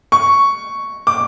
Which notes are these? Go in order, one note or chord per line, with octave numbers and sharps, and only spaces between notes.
C#6
D6